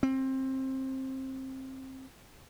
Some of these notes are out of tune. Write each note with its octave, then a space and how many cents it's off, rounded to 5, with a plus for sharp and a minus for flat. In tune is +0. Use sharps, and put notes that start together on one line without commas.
C4 +20